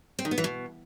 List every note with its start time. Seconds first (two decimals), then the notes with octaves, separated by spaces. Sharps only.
0.19 C4
0.25 D#3
0.31 B3
0.38 E3
0.44 B2